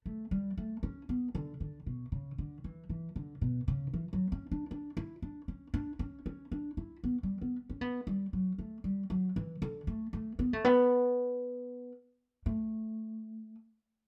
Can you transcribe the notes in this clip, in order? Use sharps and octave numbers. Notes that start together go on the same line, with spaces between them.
A3
G3
A3
C#4
B3
D3
D3
B2
C#3
D3
E3
E3
D3
B2
C#3
E3
F#3
C#4
D4
D4
E4
D4
C#4
D4
C#4
C#4
D4
E4
B3
G3
B3
C#4
B3
G3
F#3
A3
G3
F#3
E3
D3
A3
A3
B3
A3
B3
A3